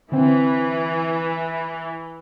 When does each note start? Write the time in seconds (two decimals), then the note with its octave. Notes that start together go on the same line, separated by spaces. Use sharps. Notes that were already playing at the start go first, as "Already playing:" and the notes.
0.12 D3 E3 C4